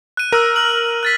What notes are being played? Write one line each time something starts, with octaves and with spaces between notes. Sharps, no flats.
F#6 D#7
A#4 E6 F#6 D#7
F6 F#6 F#7
F#6 A6 B6